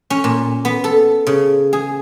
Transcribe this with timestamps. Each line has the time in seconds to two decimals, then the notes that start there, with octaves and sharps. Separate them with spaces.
0.10 C#4
0.24 A#2
0.65 B3
0.84 A4
1.27 C#3
1.73 G#4